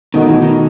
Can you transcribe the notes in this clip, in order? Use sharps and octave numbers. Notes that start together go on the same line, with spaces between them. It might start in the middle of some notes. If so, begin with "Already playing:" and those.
B2 D#3 A3 D#4 F#4
E3
D#3